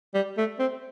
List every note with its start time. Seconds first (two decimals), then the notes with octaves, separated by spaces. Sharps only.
0.14 G3
0.37 A3
0.59 C4